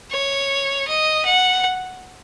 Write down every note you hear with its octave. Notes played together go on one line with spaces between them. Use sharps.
C#5
D#5
F#5